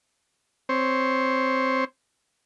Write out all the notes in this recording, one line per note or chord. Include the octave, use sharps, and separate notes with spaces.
C4 C5 C#5